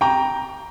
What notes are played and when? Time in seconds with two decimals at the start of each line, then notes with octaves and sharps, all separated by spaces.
0.01 G5 A#5